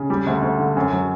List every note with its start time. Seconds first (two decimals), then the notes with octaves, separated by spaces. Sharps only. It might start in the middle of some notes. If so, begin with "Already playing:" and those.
Already playing: C#3
0.10 G3
0.27 D2
0.43 D2
0.59 D3
0.77 F#2
0.93 F#3